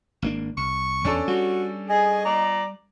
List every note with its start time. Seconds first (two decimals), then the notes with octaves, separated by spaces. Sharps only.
0.22 G#1 A#3 D4
0.57 C2 C#6
1.05 E2 C#4 D4 A4
1.28 G3 F#4
1.90 G#4 D#5 G#5
2.25 D5 A#5